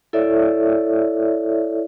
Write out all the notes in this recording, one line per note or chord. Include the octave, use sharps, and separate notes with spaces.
E4 A4 C#5 D5 E5